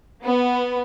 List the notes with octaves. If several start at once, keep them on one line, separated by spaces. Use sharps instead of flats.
B3